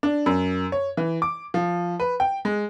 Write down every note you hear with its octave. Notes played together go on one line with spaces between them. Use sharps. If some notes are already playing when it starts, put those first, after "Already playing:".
D4
F#2
C#5
E3
D6
F3
B4
G5
G#3